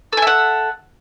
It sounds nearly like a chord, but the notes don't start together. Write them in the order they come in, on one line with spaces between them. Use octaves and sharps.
A4 G#5 E5 F#5